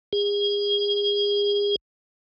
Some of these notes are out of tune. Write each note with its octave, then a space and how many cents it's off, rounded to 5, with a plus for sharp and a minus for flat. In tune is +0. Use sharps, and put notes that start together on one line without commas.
G#4 -30